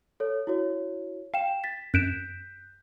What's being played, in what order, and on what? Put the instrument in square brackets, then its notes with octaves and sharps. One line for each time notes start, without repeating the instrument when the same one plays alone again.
[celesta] A4 C#5
E4 F#4 C#5
[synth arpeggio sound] F5 [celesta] G5 E7
[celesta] A6 B6
[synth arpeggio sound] F#2 D7 E7 [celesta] F#6 G6 B6